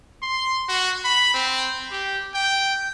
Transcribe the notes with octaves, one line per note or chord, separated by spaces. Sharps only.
C6
F#4
B5
C4
G4
G5